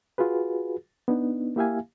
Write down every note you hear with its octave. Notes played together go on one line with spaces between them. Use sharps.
F4 F#4 G#4 B4
B3 D4 D#4
A#3 E4 G4 E5 F5 G#5